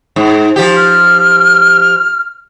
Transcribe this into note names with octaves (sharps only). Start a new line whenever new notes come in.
G#2
F3 G4
F6